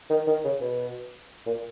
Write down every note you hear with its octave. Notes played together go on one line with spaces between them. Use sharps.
D#3
D#3
C#3
B2
A#2